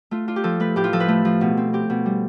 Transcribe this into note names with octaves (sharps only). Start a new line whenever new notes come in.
A3 F4
D4 F4
G4
F3 A4
A3 B4
A2 G4
F4
F3 A4
B4
A3
F3
B2
C4
C4 G4
B2
G3